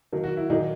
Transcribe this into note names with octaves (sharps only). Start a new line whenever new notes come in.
D#3 F#3 A#3
F#4
E4
A#2 D#3 F#3 A#3 D#4